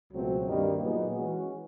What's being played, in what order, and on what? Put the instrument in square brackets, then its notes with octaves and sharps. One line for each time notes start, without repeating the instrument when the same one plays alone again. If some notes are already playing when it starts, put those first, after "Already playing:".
[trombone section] C#2 B2 F#3 A3 C4
G2 D#3 G3 A#3 D#4
A#2 F#3 B3 D#4 G#4
E3 G#3 C#4 F#4